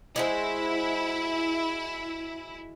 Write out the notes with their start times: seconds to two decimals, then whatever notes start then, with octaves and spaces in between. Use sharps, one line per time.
0.16 G#3 E4 F#4 C5